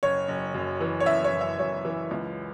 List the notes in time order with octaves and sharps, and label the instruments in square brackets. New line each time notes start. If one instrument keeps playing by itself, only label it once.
[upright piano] F#1 C#5
F#1
F#2
E3
C#5
F#1 E5
C#5
F#1
E5
F#2 C#5
E3
C#2